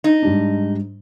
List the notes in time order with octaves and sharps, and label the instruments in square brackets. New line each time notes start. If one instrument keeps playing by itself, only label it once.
[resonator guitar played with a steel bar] D#4
[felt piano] G#2 G3 D4